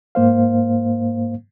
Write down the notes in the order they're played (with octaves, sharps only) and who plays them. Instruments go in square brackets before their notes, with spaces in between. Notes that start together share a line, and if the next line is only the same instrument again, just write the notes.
[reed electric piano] G#2 A#3 C5 F5